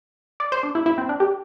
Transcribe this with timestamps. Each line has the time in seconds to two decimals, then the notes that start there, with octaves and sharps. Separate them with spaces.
0.40 D5
0.52 C5
0.63 D4
0.75 E4
0.86 E4
0.98 C4
1.09 D4
1.20 G4